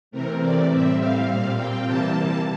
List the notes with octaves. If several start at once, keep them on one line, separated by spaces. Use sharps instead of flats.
C3 E3 A3 C4 A#4
D5
A2 G3 C4 E5
F5
A#2 G3 C4 F5
G5
C3 E3 G3 A#3 A5